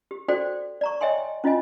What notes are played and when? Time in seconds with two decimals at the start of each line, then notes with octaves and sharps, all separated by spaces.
0.11 G4
0.28 F#4 A4 C5 D5 G5
0.81 D5 A#5 C#6
1.01 C#5 D#5 E5 G5 G#5 C6
1.44 C#4 E4 F4 D#5 G#5